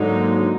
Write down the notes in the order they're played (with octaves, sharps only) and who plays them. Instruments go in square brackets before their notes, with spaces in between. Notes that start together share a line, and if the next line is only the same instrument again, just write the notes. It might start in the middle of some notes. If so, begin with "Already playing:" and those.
Already playing: [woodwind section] G#2 G#3 [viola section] D3 F#3 A#3 D#4